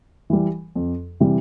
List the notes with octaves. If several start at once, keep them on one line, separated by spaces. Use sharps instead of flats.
E3 G3
F2
C3 E3 G3